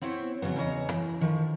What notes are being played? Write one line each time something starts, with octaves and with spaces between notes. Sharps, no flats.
B3 C4 E4 C5 C#5
F2 C#3 F#3 B3
E2 C#3 C#5 D#5
E3
D3 D#3 F3